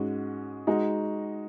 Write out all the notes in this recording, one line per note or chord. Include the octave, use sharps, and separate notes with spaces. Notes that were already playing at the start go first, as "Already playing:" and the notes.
Already playing: G#2 G#3 C#4 F#4
G#3 D#4 F#4